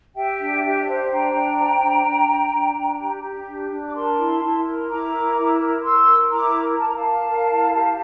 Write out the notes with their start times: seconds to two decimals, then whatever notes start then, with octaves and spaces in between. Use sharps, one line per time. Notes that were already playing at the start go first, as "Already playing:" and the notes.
0.15 G4 E5 G5
0.39 D4
0.63 G4
0.87 C5
1.10 D4 G5 A#5
1.34 D4
1.58 C5
1.81 D4
2.05 D4
2.28 D4
2.52 D4
2.76 D4
3.00 G4
3.23 G4
3.47 D4
3.71 D4
3.86 D6
3.94 A#4 A5 C6
4.18 E4
4.42 E4
4.65 A#4
4.88 E4 A#5 D6
5.12 A#4
5.37 E4
5.60 A#4
5.83 A#4 C6 E6
6.07 A#4
6.31 E4 A#5 D6
6.55 A#4
6.78 A#4 A5
6.87 A#5
6.96 F5 A5
7.02 A#4
7.26 A#4
7.50 E4
7.73 G4